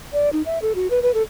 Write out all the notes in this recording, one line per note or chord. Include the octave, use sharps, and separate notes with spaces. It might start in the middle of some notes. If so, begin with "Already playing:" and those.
D5
D#4
E5
A4
F#4
B4
B4
A4